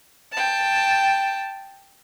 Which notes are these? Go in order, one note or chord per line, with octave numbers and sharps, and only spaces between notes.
G5 A5